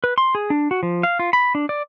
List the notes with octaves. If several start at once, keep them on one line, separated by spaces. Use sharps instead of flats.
B4
C6
G#4
D4
F#4
F3
F5
F4
B5
D4
D5